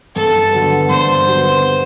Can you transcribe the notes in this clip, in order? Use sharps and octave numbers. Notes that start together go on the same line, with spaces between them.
G2 A4
D3 F#3 B3
G2 C5
D3 F#3 B3